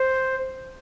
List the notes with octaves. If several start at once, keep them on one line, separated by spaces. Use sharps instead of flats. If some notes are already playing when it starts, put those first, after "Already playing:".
Already playing: C5